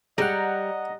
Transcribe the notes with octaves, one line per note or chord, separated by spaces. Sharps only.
G#2 C3 G3 D#5 F#5 A#5